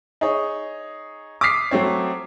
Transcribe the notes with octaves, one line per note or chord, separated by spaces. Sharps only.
D#4 G#4 C#5
D6 D#6 F6 B6 C7
F#3 A3 C4 C#5